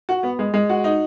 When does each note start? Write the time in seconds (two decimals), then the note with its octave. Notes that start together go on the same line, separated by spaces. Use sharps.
0.09 F#4
0.23 B3
0.39 G#3
0.54 G#3
0.69 F#4
0.84 D#4